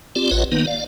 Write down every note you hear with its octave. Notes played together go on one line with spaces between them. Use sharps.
C4 F4 G4 D5
A1 F4 B4 C#5 D#5 F#5
D#3 A#3 B3 D#4 B4
D5 F5